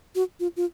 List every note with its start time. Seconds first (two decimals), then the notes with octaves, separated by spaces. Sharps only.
0.15 F#4
0.40 F4
0.57 F4